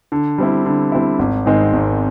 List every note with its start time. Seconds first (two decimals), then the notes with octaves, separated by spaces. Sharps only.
0.12 D3
0.38 G3 C4 E4
0.66 D3
0.92 G3 C4 E4
1.19 G#1
1.46 G#2 D#3 G#3 C4
1.73 G#1